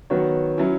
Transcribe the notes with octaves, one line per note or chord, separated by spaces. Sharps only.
D#3 F#3 B3 F#4 C#5
F#3 C#4 E4